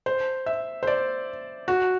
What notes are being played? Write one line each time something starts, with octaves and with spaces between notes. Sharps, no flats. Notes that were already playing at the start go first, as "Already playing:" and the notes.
C5
E5
C5
D5
F#4